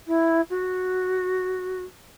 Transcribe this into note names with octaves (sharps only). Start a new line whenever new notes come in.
E4
F#4